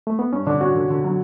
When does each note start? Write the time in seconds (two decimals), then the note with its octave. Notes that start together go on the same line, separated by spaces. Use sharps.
0.07 A3
0.19 B3
0.32 G2 C#4
0.47 D3 D4
0.60 C#4 F#4
0.76 D3
0.90 D3
1.04 F#3